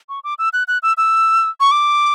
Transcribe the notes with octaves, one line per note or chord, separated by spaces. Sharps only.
C#6
D6
E6
F#6
F#6
E6
E6
C#6
D6